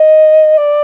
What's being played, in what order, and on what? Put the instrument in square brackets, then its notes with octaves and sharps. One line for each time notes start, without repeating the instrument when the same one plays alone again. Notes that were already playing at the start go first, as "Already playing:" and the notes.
Already playing: [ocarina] D#5
D5